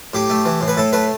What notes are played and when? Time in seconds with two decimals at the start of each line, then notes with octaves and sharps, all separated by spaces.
0.14 A2 G4
0.30 A3
0.45 E3
0.61 A2
0.68 B4
0.77 A2 A4
0.93 A3 B4